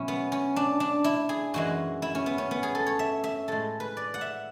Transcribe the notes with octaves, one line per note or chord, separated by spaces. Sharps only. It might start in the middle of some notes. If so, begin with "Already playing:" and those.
Already playing: B2 F#3 C#4 E4
B3
C#4
D4
D4
E4
G#4
F#2 E3 G#3 F#4
E4
C#4
B3
C#4
B3
G#4
A4
C#5
E5
E5
A2 G#3 A4
B4
D5
F#5
E5